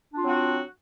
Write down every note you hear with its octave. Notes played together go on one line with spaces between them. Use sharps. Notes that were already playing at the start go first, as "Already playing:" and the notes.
F#3 C4 D4 F4 F#4